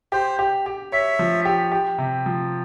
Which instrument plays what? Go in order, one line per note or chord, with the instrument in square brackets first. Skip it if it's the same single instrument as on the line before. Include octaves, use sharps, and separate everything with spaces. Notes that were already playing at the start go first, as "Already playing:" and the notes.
[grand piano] G4 [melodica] C5
[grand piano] G4
G4
[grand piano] C#5 [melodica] E5
[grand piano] F3
G4
G4
C3
F3